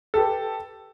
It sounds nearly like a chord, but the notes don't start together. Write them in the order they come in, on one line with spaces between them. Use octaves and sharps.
A4 G4 B4